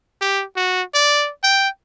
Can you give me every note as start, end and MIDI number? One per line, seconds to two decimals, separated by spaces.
0.21 0.44 67
0.56 0.82 66
0.94 1.30 74
1.43 1.68 79